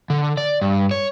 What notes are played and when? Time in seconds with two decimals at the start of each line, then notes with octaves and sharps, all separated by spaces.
0.10 D3
0.37 D5
0.61 G2
0.91 C#5